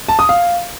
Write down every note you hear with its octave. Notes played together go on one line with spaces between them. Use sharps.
A5
D#6
F5